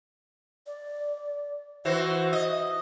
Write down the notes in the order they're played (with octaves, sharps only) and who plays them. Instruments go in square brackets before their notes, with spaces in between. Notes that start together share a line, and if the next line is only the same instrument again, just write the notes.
[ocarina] D5
[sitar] E3 F#4 C5 [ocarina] E5
[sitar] D#5